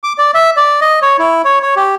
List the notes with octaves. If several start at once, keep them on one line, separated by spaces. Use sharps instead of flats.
D6
D5
E5
D5
D#5
C#5
E4
C#5
C#5
G4